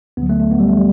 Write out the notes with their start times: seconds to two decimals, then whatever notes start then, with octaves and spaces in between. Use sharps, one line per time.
0.17 D2 D3 F#3 B3
0.29 A3
0.40 A3
0.51 B3
0.60 G3
0.68 A3
0.77 G3